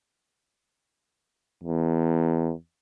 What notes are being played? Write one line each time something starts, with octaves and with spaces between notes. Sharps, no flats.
E2